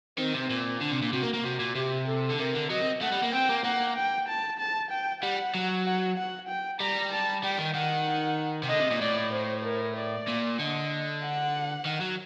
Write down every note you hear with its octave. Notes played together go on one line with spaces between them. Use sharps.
D#3 C4
C3
A#2 C4
D3 D4
C3
A#2
C3 F#4
A#3
A#3
C3 F#4
A#2
C3 G4
A4
D3
C3 A#4
D3
F#3 D#5
C4
A3 F#5
G3
A#3
C4 G5
A#3
A#3 F#5
G5
A5
A5
G5
G3 F#5
F#3
F#5
F#5
G5
G3 A#5
A5
G3 G5
D#3
D#3 F#5
C3
D3 D#5
C3
A#2
A2 D5
C5
A#4
D5
A#2
D3 D#5
F#5
D#3
F#3